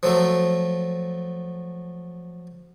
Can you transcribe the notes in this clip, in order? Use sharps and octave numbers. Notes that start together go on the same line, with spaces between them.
F3 F#3 A3